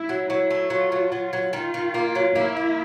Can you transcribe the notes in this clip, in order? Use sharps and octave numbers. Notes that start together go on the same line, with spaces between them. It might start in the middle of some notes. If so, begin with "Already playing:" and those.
Already playing: E4
F#3
F#3 E4
A3
F#3 F4
F#3
F#3
F#3
D#3 F4
D#3
A#3
F#3
A#3 E4
A#3